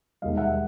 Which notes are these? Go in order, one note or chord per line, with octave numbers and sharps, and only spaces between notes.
E1 D#2 D#3 G3 D#5 F5
E5 F#5